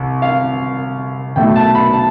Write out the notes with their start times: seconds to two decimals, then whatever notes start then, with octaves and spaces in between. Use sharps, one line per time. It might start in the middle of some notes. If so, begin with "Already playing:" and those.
Already playing: C2
0.22 F5
1.36 B1 B2 A3 G5
1.56 A5
1.75 B5
1.93 A5